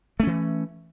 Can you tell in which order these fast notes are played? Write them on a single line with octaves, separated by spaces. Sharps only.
A3 C#4 E3